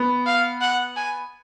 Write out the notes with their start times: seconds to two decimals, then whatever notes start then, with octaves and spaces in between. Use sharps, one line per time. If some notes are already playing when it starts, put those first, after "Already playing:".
Already playing: B3
0.26 F5
0.61 F#5
0.96 G#5